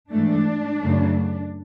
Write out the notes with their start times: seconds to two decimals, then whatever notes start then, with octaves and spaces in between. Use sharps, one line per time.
0.11 G#2 E3 A3 D4
0.81 F#2 C#3 F#3 A3